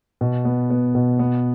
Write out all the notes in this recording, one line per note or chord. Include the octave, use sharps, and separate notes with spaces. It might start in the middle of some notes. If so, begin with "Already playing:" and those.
B2
B3
B3
B2
B3